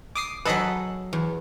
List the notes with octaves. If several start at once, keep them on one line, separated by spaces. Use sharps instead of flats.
D6 D#6 C7
F#3 G#4 A4 B4 D#5 B5
E2